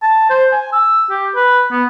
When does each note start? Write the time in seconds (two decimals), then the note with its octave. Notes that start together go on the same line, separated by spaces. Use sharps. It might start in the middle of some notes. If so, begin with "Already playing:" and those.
0.03 A5
0.30 C5
0.52 G#5
0.73 E6
1.11 G4
1.36 B4
1.71 B3